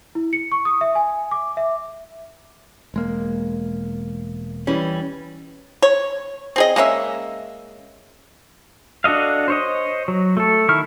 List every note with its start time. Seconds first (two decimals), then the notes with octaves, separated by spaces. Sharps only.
0.15 E4
0.33 C#7
0.52 C#6
0.65 D#6
0.81 E5
0.95 G#5
1.31 D6
1.57 E5
2.94 E1 G#3 A#3
4.67 E3 G3 C#4
5.82 C#5
6.56 C4 G#4 D#5
6.76 G#3 A#3 C#4 E5
9.04 D4 F#4 A4 D#5 F5
9.48 C5 C#5 D#5
10.08 F#3
10.37 A3 A4
10.69 D#3 E4 C#6 F6